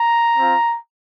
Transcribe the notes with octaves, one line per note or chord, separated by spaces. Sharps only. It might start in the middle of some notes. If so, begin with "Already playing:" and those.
Already playing: A#5
C4 F4